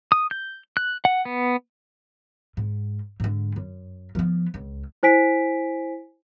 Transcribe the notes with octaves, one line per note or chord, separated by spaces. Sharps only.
D#6
G6
F#6
F#5
B3
G#2
G#2 D3
F#2
F3 B3
C#2
E4 C5 G#5 B6 D7